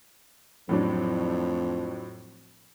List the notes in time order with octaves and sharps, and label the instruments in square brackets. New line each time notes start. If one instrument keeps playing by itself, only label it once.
[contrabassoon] F2 [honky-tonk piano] A2 F#3 D4